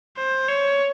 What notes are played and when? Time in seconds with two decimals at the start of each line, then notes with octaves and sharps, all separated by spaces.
0.17 C5
0.48 C#5